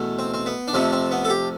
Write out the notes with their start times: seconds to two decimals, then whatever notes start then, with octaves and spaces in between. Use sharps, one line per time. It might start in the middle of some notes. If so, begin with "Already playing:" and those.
Already playing: E2 B2 A3
0.19 C4
0.34 C4
0.46 B3
0.68 D4
0.73 F2 C3 F3 A3 C4
0.92 C4
1.11 B3
1.25 A4
1.30 G4